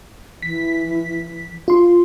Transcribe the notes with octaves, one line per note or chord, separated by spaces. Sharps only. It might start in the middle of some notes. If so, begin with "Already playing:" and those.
E3 B6
F4 C6